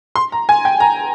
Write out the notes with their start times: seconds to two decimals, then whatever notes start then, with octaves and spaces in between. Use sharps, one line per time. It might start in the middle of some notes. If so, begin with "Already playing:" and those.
0.16 C6
0.32 A#5
0.49 G#5
0.65 G5
0.80 A#5